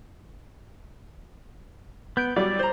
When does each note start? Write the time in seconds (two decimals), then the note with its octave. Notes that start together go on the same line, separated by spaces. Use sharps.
2.17 B3 G6 D7
2.36 F#3 G3 D5
2.59 C5 A#5